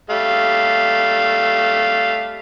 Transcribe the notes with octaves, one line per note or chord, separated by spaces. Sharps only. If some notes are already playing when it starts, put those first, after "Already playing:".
G3 A3 F5